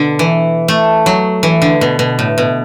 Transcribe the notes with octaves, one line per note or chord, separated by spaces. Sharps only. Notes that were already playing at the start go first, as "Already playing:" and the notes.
Already playing: B2 D3
E3
A3
F#3
E3
D3
B2
B2
A2
B2